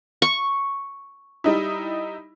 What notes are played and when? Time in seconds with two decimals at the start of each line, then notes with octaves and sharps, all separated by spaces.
0.22 C#6
1.44 G3 D#4 E4